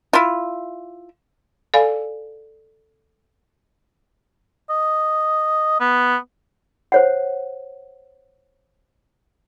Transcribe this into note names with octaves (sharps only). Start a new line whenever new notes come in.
E4 F4
A4 D5 F5 G#5
D#5
B3
C5 C#5 F#5